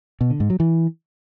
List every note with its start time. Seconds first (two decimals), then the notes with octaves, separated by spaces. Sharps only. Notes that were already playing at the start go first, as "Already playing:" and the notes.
0.21 B2
0.30 D3
0.40 G#2
0.50 F#3
0.60 E3